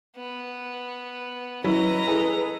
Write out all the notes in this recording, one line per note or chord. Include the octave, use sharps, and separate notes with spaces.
B3
F#3 C#4 E4 B4 D#5 A#5
E4 G#4 A4